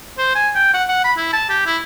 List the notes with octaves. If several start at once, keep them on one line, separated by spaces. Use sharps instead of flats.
C5
G#5
G5
F#5
F#5
B5
E4
A5
G4
E4